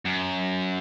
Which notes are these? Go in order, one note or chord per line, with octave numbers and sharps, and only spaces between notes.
F#2